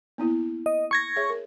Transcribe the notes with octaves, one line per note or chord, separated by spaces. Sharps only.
A#3 B3 E4
D#5
C#6 G#6 A#6
G#4 C#5 E5
A#4